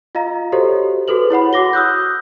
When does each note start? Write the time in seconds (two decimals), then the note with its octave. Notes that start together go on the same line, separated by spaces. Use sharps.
0.15 F4 D#5 F5 A#5
0.52 F#4 G4 A4 C5 C#5 D#5
1.08 F#4 G#4 A4 B4 F#7
1.30 E4 C#5 F#5 B5
1.53 F#4 F#5 D6 A#6 G7
1.73 D#6 E6 F#6 G6